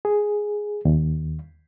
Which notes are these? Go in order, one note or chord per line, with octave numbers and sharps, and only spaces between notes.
G#4
D#2